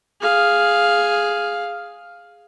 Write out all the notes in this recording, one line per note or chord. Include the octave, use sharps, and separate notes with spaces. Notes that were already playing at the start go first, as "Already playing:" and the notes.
G#4 F5